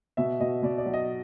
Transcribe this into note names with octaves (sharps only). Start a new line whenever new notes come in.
B2 E5
B2 D#5
B2 D5
D5
F#3
D#5